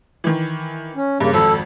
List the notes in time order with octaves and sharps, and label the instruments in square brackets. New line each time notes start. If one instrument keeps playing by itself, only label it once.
[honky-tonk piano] D#3 E3
[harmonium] C#4
[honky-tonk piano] G2 [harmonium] C#3 A#3
[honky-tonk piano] G#1 F2 [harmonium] A4